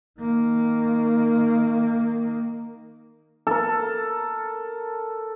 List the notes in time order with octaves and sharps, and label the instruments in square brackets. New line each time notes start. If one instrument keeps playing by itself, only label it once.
[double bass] D#3 A#3
[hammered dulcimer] A4 A#4